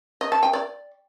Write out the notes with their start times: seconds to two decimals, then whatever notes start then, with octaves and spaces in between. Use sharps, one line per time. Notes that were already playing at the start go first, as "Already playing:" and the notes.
0.21 D#5
0.32 A5
0.43 G5
0.53 D5